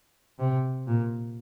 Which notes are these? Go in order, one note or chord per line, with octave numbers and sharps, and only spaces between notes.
C3
A#2